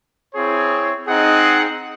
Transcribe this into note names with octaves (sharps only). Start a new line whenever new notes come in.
C4 E4 G#4 C#5
C4 D#4 G#4 D#5 F#5